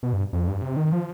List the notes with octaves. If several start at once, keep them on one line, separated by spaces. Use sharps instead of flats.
B2
G2
F2
G2
C3
D#3
F3